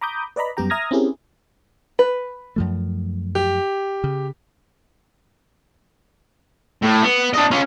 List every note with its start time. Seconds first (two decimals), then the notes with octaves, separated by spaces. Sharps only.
0.01 A#5 B5 D6 D#6 G6
0.36 B4 D5 D#5 A#5 B5
0.57 F#2 G3 B3 G4 G5 A#5
0.70 E5 A#5 D#6 F6 G#6 A#6
0.91 C4 C#4 E4 G4 G#4 A#4
1.99 B4
2.56 F#2 F3 A3
3.35 G4
4.04 C#3
6.83 A2
7.02 B3
7.34 D4 D#5
7.51 C#4 F4